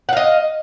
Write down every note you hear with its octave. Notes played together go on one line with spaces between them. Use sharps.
D#5 F5 F#5